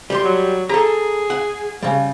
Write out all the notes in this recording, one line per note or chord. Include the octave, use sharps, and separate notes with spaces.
G3 G4 C6
F#3
G#4 A4 A#5
F#5
C#3 G3